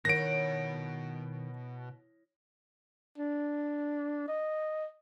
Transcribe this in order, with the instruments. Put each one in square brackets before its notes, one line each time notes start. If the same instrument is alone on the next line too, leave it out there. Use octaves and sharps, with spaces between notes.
[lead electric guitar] B2 F#5 [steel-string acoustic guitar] D#3 [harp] E4 C#5 [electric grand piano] A#6 D7
[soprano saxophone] D4
D#5